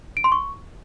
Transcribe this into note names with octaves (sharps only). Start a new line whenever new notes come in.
D7
C6
C#6